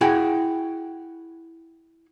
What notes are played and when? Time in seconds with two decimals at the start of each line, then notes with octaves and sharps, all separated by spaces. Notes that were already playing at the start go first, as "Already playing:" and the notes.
0.01 E4 F#4 G#4 G5